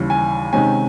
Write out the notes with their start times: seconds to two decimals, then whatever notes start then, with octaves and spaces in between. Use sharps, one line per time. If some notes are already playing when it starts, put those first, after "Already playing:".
Already playing: D#2 C#3 E3 G3
0.10 G#5
0.53 C3 D#3 G#3 C#4 G#5